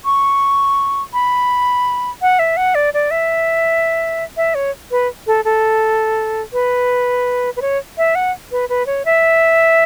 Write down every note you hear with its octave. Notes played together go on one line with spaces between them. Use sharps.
C#6
B5
F#5
E5
F#5
D5
D5
E5
E5
C#5
B4
A4
A4
B4
B4
C#5
E5
F#5
B4
B4
C#5
E5